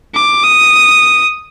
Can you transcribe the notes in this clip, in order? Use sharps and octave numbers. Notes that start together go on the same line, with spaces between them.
D6
D#6